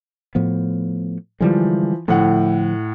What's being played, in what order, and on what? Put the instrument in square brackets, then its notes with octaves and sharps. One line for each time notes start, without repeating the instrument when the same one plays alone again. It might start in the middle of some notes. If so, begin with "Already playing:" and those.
[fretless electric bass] A2 F3 B3
[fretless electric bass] D3 G3 G#3 [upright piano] E3 F3
[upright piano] A2 F#5 [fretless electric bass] D3 F3 A3